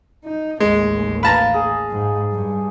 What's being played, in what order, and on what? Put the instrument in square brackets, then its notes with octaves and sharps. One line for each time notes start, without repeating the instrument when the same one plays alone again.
[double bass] D#4
[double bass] A1 D#2 [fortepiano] G#3
[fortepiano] B4 A5 A#5 [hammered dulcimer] F5
[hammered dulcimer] G#4
[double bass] G#2
G2